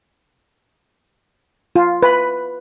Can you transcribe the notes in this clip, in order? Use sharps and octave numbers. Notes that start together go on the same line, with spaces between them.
F4
B4